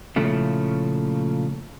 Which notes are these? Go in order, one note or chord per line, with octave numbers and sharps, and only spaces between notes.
A#2 C#3 F3 A3 E4